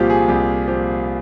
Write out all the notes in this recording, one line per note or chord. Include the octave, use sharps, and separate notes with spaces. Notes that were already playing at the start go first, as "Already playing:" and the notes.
Already playing: C2 A#2 F3 F4 G4
G#4
C2 G4
A#2 F3 G4